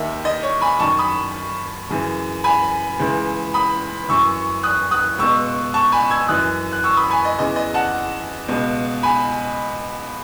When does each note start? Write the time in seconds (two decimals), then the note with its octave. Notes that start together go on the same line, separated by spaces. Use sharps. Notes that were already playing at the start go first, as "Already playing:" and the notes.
Already playing: D#2 D#3 E5
0.25 D#5
0.43 C#5
0.61 G#5 B5
0.79 F#2 D#3 A5 C#6
0.99 B5 D#6
1.90 F#2 C#3 E3
2.44 G#5 B5
2.99 C#2 C#3 E3
3.54 B5 D#6
4.09 F#2 E3 C#6 E6
4.63 D#6 F#6
4.91 D#6 F#6
5.18 C#2 B2 C#6 E6
5.74 A5 C#6
5.92 G#5 B5
6.11 E6 G#6
6.28 F#2 E3 D#6 F#6
6.72 F#6
6.84 C#6 E6
6.97 B5 D#6
7.10 G#5 B5
7.25 D#5
7.39 E2 C#3 E3 D#5
7.56 D#5
7.74 F#5 A5
8.48 C#2 B2
9.03 G#5 B5